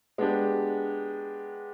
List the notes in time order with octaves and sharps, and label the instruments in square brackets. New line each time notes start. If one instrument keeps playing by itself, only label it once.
[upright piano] G#3 B3 D4 G4